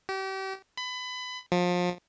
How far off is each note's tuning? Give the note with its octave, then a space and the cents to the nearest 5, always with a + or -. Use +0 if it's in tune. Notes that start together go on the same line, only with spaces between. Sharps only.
G4 -35
B5 +25
F3 +30